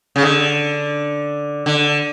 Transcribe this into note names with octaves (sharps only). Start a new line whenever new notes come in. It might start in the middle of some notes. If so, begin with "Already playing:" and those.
C#3
D3
D3